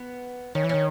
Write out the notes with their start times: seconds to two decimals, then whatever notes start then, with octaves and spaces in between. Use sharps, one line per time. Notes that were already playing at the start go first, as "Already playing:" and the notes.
Already playing: B3
0.55 D#3 C#4
0.64 E3
0.69 D#3 C#4